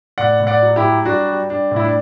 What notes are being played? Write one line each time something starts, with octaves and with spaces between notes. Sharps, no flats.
A2 D5 F#5
A2
D5 F#5
F#3
E4 G4
F#3
G3 D4 F#4
G3
G3 D4
A2
E4
D4